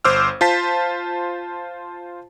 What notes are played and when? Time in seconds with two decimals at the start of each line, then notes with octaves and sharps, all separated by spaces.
0.05 G1 C5 D6 E6 F6
0.41 F4 C5 A5 B6